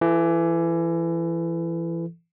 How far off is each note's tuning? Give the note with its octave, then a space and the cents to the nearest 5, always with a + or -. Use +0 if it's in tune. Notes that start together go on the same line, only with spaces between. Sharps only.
E3 +25 A4 +0